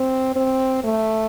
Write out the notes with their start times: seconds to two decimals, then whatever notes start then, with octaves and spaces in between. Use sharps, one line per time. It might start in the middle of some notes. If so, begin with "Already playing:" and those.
Already playing: C4
0.36 C4
0.84 A3